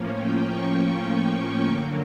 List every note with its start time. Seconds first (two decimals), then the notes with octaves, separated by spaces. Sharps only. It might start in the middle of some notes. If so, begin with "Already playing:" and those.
Already playing: A2 F3 A#3 C#4
0.14 G5
0.45 C#6
1.66 F#2 D3 F#3 A#3 D6